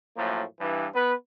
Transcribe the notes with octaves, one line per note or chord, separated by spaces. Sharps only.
F#2 A2 F3 A#3
G2 E3
B3 B4